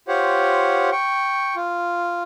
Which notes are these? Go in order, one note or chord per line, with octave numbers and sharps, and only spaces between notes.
F4 G4 C5 C#5 F#5
G5 C#6
F4